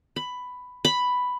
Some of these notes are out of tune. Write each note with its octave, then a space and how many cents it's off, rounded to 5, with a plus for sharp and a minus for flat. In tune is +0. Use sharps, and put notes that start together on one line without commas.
B5 +10
B5 +5